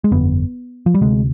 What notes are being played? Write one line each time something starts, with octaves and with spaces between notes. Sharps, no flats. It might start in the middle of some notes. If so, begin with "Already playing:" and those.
G#3
G1 F2 D3 B3
F3
G3
D2 C3 G#3